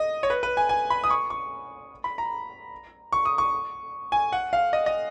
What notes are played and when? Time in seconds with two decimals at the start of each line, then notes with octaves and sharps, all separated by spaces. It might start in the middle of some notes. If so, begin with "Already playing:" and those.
Already playing: D#5
0.23 C#5
0.30 B4
0.43 B4
0.57 G#5
0.69 G#5
0.90 B5
1.04 D#6
1.10 C#6
1.30 C#6
2.04 B5
2.18 A#5
3.12 C#6
3.25 D#6
3.38 C#6
4.12 G#5
4.33 F#5
4.53 F5
4.73 D#5
4.86 D#5